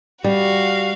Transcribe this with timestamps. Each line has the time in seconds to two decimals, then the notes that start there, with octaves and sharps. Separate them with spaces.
0.24 G3 F#4 F5